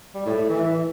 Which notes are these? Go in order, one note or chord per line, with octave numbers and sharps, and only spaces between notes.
G3
A2
A3
E3